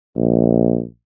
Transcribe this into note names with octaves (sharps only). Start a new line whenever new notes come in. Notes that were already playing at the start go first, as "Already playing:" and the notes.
A#1